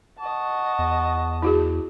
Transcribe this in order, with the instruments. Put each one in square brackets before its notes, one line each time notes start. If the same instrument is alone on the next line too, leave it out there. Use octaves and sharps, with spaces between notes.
[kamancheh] D#5 A5 [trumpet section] F#5 C#6
[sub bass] E2
[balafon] E4 F#4 G#4